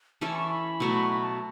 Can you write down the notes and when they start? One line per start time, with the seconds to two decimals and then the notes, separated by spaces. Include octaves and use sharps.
0.21 E3 C#4 E4 A4 A5
0.36 C#6
0.50 B5
0.80 B2 F#3 A3 F#4
1.09 B5
1.23 A5